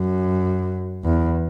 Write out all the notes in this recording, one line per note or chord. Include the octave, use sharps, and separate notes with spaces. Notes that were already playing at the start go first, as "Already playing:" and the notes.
Already playing: F#2
E2